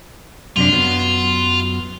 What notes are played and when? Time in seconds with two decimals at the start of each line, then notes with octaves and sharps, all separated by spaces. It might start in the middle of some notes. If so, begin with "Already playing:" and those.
0.56 F#2 C3 D4 F4
0.72 F#2 F#3 B3